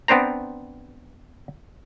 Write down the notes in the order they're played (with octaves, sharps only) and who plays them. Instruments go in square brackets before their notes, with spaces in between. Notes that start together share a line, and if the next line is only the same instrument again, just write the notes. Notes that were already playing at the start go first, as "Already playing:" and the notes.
[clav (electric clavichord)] B3 C4 D4 C5 A#5